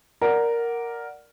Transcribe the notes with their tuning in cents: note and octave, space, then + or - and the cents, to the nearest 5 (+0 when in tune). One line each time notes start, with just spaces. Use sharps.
A#4 +0 D5 +0 F#5 +0